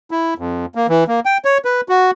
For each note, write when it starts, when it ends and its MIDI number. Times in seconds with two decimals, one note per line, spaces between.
0.11 0.34 64
0.38 0.66 41
0.75 0.87 58
0.89 1.04 52
1.08 1.20 58
1.25 1.38 79
1.45 1.58 73
1.65 1.81 71
1.89 2.11 66